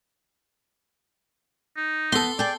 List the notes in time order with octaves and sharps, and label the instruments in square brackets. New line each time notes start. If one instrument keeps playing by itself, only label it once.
[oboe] D#4
[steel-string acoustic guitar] B3 [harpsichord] A4 C6
[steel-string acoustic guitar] G#4 G5 [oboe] D5